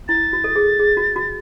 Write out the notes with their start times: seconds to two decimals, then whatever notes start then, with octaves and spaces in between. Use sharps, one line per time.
0.08 E4 A6
0.33 F#4
0.44 A4
0.56 G#4
0.79 G#4
0.97 F#4
1.16 F#4